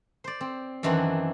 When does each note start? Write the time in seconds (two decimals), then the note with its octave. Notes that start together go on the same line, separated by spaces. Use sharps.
0.24 C5 D5
0.41 C4
0.83 F#2 D#3 E3 C4 D4 F#4